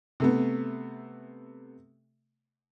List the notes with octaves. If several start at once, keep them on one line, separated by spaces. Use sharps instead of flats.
C3 A3 B3